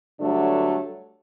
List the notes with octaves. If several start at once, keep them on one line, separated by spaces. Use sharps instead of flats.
G2 D3 F#3 A3 D4